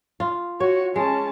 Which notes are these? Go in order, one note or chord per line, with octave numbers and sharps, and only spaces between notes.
F4
F#4 C#5
G#3 C#4 A5